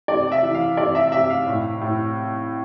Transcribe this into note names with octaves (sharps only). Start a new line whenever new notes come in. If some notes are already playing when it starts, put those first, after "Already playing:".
C3 D5
E5
E3
F5
C3 D5
E5
C3 E5
F5
A2
A2